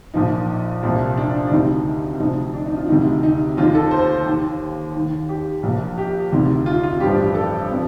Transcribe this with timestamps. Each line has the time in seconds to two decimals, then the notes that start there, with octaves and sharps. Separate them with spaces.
0.14 A#1 A#2 F3 D#4
0.83 C2 A#2 F3
1.17 D4
1.47 D4
1.51 D2 C3 D#3 D#4
2.20 D2 C3 F3 D#4
2.54 D4
2.66 D#4
2.77 F4
2.88 D2 C3 D#3 D#4
3.23 D#4
3.57 D#2 D#3 F4
3.75 A4
3.91 C5
4.26 D#2 D#3
4.95 D#2 D#3
5.29 G4
5.63 A#1 A#2 F3
5.98 G4
6.32 D2 C3 D#3
6.66 F4
6.83 F4
7.00 A1 G2 F3 G4
7.35 A4
7.71 C3 F3